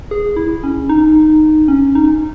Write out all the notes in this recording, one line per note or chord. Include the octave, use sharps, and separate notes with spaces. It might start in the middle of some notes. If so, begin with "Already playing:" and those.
G#4
E4
C#4
D#4
C#4
D#4